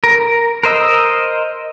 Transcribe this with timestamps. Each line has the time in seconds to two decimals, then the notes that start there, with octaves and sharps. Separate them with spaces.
0.04 A#4
0.63 A#4 C5 D#5 E6